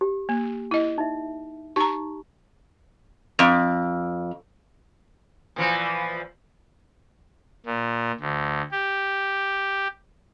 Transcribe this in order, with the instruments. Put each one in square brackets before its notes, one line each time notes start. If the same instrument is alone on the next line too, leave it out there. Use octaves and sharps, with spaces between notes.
[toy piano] G4
[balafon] A#3
E4 D#5
[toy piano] D#4 E5
[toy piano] D#4 G4 [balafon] A#5 C#6
[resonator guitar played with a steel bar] F2
[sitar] A#2 E3 F3
[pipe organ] A#2
D2
G4